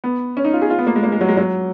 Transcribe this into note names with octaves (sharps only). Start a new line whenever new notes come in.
B3
C#4
D#4
F4
G#4
F4
B3
A#3
G#3
A#3
G#3
F#3
G#3
F#3